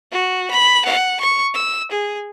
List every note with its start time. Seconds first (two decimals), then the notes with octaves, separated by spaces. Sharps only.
0.12 F#4
0.51 B5
0.85 F#5
1.20 C#6
1.54 E6
1.91 G#4